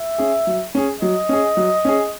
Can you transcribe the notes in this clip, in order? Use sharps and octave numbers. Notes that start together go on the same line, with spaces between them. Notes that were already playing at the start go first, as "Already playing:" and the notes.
Already playing: E5
C#4 G#4
F#3
C#4 G#4
F#3 D#5
C#4 G#4
F#3
C#4 G#4